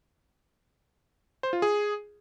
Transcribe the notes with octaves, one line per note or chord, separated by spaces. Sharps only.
C5
F4
G#4